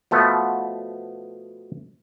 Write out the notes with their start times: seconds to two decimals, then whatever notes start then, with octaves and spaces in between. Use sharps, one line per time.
0.11 B2 F3 A3 B3